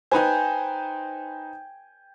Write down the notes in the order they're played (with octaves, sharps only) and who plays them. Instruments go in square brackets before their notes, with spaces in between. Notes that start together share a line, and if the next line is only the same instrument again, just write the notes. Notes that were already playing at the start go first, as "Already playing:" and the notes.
[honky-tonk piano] D#4 B4 C5 [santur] G5 G#5